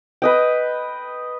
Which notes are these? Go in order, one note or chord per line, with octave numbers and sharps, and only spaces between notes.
B4 D#5 G5